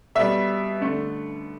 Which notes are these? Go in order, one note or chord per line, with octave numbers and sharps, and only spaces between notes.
B2 G3 E5
D3 A3